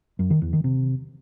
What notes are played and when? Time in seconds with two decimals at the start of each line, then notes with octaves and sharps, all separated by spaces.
0.19 F#2
0.30 D#3
0.42 E2
0.53 D#3
0.64 C3